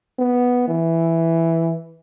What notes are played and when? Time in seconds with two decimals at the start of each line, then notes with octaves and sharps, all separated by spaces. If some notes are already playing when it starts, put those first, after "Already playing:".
0.19 B3
0.68 E3